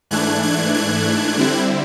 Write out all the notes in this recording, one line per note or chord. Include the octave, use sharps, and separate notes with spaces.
G#2 E3 A3 D4 F#6 G#6
F#6 G#6
F#6 G#6
D3 G3 C4 E4